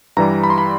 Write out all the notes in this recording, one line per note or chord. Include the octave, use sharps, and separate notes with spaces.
G2 E3 G3 A#5
B5
C6
B5